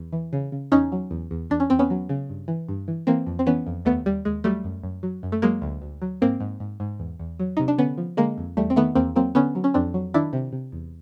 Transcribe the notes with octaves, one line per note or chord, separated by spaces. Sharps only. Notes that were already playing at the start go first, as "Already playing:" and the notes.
Already playing: E2
E3
C#3
C#3
E2 C#4 D#4
F#3
E2
E2
E2 D4
C#4
E2 C4
B3 C#4
F#3
C#3
G2
E3
G2
E3
E3 A#3 C4
F2
C4
E3 B3 C#4
F2
D#2 A3 B3
D#2 G3
D#2 G#3
F#3 G3 A3
F#2
F#2
F#3
F#2
A3
F#3 G#3 A#3
D2
D2
F#3
G#2 A#3 C4
G#2
G#2
G#2
E2
E2
F#3
C3 D#4
D4
D3 B3 C#4
F3
D3 G#3 A#3
F2
E2 G3 A3
C4
D#3 A3 B3
E2 A#3 C4
F#3 A#3 C4
D3 B3 C#4
F#3
C#4
F2 C4 D4
F#3
D#3 D4 E4
C3
C3
E2